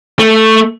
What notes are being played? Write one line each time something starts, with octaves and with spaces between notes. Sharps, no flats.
A3